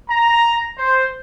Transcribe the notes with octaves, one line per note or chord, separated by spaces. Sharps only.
A#5
C5